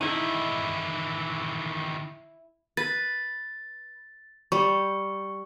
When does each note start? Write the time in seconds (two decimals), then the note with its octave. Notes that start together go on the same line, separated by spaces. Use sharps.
0.01 D#3 E3 D#4 E4
2.77 B4 A6
4.52 G3 C#6